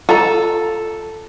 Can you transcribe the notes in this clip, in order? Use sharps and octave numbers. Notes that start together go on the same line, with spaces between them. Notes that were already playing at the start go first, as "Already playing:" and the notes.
F4 A4 A#5